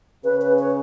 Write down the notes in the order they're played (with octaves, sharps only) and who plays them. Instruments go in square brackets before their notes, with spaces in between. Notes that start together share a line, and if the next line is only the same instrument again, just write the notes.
[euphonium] C#3 [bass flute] B4
[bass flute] B4
C#5